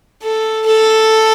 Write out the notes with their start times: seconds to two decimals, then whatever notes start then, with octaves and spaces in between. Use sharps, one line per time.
0.23 A4
0.66 A4